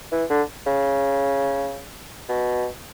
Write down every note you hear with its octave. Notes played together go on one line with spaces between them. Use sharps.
E3
D3
C#3
B2